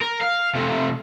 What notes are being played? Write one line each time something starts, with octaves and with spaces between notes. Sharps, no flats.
A#4
F5
C3 A3